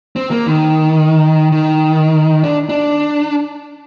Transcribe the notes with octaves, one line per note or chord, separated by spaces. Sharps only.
C4
A#3
D#3
D#3
D4
D4